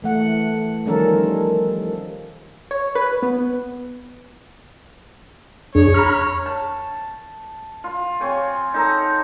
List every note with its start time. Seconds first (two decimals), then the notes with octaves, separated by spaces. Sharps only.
0.02 E3 A3 F#5
0.86 D#3 F3 G3 C#4 A4 A#4
2.71 C#5
2.95 B4
3.22 B3
5.75 F2 D4 G#4 C#5
5.94 A#5 B5 F6
6.46 A5
7.84 F4
8.20 C4 C#5 G#5
8.74 D#4 A4 A#5